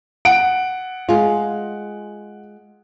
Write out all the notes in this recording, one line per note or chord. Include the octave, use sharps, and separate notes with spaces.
F#5 D7
G#3 F4